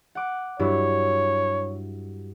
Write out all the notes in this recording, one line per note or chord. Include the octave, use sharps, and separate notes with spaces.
F#5 D6
G2 F#3 E4 C#5